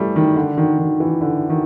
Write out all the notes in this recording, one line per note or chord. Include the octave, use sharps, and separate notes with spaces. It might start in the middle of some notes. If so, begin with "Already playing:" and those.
Already playing: E3 G3 A3
D#3
D3
D#3
D#3
E3
D3
D#3